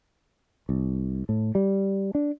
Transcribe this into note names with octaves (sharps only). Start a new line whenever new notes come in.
C2
A2
G3
D4